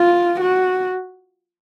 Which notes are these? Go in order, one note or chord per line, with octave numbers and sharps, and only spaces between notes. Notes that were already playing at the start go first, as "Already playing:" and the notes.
Already playing: F4
F#4